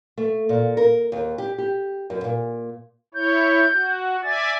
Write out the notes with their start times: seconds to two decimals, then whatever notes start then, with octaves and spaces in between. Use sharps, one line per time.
0.17 A3
0.49 A#2
0.77 A#4
1.12 D#2
1.38 G4
1.58 G4
2.10 F#2
2.24 A#2
3.14 E4 C#5 G6
3.72 F#4
4.23 D5 E5 G#5 A6